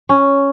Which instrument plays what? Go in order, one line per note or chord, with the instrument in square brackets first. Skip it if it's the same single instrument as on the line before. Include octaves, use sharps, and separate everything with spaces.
[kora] C#4